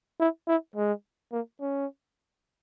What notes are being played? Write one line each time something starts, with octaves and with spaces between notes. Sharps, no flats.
E4
E4
G#3
A#3
C#4